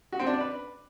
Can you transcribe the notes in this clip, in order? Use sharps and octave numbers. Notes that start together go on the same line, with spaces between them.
F#4
C4
D4
D5
B4